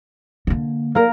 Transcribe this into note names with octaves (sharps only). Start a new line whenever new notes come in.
D3 A#3
A#3 A#4